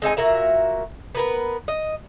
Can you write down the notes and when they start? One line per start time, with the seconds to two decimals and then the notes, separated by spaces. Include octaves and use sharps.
0.02 G#3 C4 D#4 G#5
0.17 A#2 F#4 A#4 E5
1.15 B3 A#4 B4
1.68 D#5